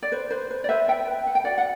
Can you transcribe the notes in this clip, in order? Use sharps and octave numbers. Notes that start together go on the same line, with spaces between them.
D5
B4 C5
B4 C5
B4 C5
D5
B4 C5 E5
B4 E5 G5
B4
B4 F#5
G5
F#4 D5 F#5
F#5